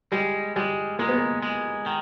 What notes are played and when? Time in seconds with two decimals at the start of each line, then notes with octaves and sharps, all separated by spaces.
0.12 G3 G#3
0.56 G3 G#3
0.99 G#3 A#3
1.09 B3
1.18 A#3
1.43 G#3
1.86 D#3